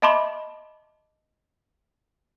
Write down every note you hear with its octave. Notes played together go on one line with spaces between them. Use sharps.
D#5 E5 A5 B5 C6 D6